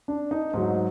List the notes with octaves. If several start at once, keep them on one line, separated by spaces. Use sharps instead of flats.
D4
D#4
G#2 F#3 D#4